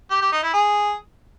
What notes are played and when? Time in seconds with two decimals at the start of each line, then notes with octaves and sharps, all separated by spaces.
0.11 G4
0.21 G4
0.32 D#4
0.43 E4
0.53 G#4